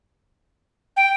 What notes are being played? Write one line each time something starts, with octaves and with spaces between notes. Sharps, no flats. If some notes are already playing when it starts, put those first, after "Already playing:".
G5